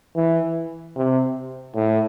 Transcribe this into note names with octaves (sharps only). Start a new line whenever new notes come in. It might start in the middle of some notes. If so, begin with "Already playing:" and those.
E3
C3
A2